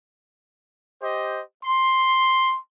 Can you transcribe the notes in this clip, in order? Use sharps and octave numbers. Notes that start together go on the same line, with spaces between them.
G4 C5 D#5
C6